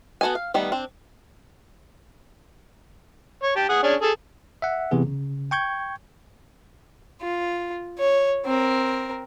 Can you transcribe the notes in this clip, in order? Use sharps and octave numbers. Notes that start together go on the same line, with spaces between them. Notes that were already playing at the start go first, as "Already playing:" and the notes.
B3 F#4 A4 D#5 G#5
F5
D#3 G3 A3 B3
C4 D4
C#5
G4 G5 A5
G#4 F#5 D#6
C#4 D4 G#4
G#4 A4
E5 F#5
C3 E3 B3 G#4
C#3
G5 C#6 G6 G#6
F4
C#5
C4 A#4